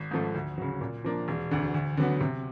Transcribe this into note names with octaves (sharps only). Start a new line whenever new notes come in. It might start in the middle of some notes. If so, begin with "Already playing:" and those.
Already playing: G#1
G#2 F3 A3
D2
C#3 F#3
A#2
F3 A#3 D4
E1
D2 D3
D2
D3 F#3 B3
C3